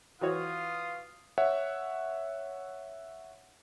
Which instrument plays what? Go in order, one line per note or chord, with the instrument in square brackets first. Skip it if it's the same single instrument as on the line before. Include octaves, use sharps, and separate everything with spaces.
[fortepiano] E3 F#4 C#5 [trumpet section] F4 F5 D#6
[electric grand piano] C#5 E5 F#5